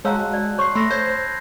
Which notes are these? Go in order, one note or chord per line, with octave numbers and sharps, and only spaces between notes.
G#3 F#4 C#5 F5 A5 A#5 E6 F#6
D5
C#5 C6 C#6 C7
A3 B5 C6 E6 A#6
C5 C#5 G6 G#6 C7